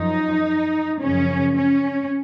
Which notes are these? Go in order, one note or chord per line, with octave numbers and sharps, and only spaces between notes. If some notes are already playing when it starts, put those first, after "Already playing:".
Already playing: F#2 F3 D#4
F#2 C#3 F3 C#4
C#4